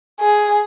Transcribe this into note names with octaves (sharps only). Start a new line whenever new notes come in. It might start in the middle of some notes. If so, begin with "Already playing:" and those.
G#4